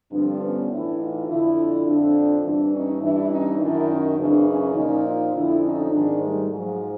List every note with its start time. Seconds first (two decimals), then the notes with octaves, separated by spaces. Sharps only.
0.11 G2 D3 F3 C4 D4
0.40 B3 C#4
0.69 A2 E3 D4 E4
0.99 D#4 F4
1.27 F2 D3 F3 D4 E4
1.85 F2 D3 F3 C4 D4
2.43 G2 E3 C4 D4
2.72 C#4 D#4
3.01 G2 E3 D4 E4
3.30 C#4 D#4
3.59 F#2 D#3 D4 E4
3.88 C#4 D#4
4.17 F#2 C#3 E3 C4 D4
4.47 C#4 D#4
4.75 A#2 F3 C#4 D#4
5.04 D#4 F4
5.33 F2 D3 F3 D4 E4
5.62 C#4 D#4
5.91 G#2 D#3 C4 D4
6.20 G3 A3
6.49 G#2 F3 F#3 G#3